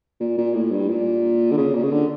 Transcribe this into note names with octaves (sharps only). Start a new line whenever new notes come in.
A#2
A#2
A2
G2
A#2
D3
C#3
A#2
C#3
D3